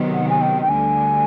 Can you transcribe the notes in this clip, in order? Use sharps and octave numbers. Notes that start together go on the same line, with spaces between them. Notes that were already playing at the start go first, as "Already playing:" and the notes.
Already playing: C3 D#3 F#3 B3
F#5
G#5
G5
G5
D2 D3 G3 G#5